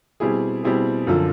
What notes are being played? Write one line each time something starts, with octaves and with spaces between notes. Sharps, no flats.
B2 G3 C4 E4 G#4
B2 G3 C4 E4 G#4
F#2 D3 F3